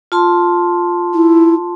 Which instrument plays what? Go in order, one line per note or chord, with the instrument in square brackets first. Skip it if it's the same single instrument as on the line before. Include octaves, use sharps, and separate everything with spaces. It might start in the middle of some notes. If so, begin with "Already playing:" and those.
[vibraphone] F4 A5 C6
[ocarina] E4